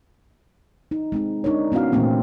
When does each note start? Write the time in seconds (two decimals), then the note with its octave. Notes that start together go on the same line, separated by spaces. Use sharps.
0.91 D#4
1.12 G#3 C4 D#4
1.44 D4 D#4 A#4 C#5
1.72 B3 C#4 E4 F#4 F5
1.92 A#2 E3 A3 A#3 C4 C#4